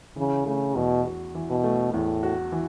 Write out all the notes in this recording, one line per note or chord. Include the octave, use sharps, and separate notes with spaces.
C#3 E3
C#3 A3
E2 B2
F#4
E3
B2
A3
E2 A2
F#4
E3